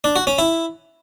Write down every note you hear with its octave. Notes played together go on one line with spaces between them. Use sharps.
D4
F#4
C#4
E4